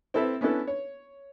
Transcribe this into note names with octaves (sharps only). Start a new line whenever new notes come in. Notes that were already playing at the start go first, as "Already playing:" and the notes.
C4 E4 A4 B4 E5
B3 C#4 D4 E4 A4 B4
C#5